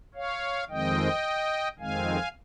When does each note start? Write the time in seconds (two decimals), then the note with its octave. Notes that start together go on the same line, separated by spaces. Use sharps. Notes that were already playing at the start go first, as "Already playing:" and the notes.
0.14 C#5 F5
0.69 F2 D#3 G#3 C4 D#5 G5
1.79 F2 D#3 G#3 C4 F5 G#5